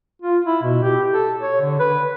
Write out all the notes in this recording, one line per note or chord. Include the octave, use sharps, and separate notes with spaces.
F4
E4
B2
G4
A4
C#5
D3
B4